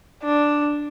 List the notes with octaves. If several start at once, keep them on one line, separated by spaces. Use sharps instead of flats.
D4